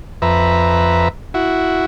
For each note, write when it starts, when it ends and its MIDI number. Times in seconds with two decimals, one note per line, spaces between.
0.22 1.08 41
0.22 1.08 71
0.22 1.08 76
0.22 1.08 82
1.34 1.86 64
1.34 1.86 66